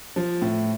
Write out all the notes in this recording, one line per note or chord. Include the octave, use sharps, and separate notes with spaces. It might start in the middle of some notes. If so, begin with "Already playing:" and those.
F3
A2